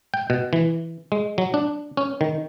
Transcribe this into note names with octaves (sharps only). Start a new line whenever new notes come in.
G5
B2
E3
G#3
F#3
D4
C#4
D#3